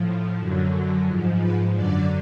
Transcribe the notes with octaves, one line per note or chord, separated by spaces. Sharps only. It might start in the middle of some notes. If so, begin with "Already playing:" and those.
Already playing: A2 F3
F#2 D3 F#3
G#2 F3
B4
F#2 D3 F#3 D5